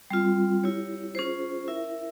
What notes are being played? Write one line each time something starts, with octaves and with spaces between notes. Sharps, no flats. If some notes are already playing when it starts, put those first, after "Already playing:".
G3 C4 F4
E4 G4 C#5
C#4 F4 G#4 C5
E4 A#4 E5